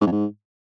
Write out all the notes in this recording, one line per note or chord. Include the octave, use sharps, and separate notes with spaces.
G#2
F2
G#2